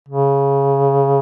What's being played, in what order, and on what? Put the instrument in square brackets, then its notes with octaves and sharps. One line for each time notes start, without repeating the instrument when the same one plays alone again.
[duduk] C#3